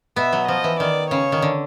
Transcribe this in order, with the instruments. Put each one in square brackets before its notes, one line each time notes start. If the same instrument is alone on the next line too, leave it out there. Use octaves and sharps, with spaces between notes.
[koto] B2 B3 [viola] E5
[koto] F#3
[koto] F3 [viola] D#5
[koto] E3
[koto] D#3 [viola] D5
[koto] C#3 [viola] C#5
[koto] D#3
D3